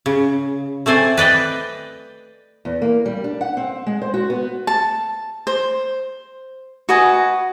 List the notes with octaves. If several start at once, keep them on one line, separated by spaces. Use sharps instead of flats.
C#3
A3 C4 C5 D5 G#5
B4 D5 D#5 G5
E2
A#3
G3
D4
F#5
C4
G#3
C5
F#4
B3
A5
C5
F#4 B4 D#5 G#5